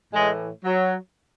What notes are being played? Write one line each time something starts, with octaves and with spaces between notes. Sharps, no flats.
A2 E3 G#3
F#3